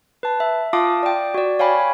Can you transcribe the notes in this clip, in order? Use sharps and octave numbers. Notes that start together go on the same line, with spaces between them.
B4 A5
E5
F4 F5 A5 D6 D#6
D5 G5
F#4 D5
C#5 F5 G5 G#5 B5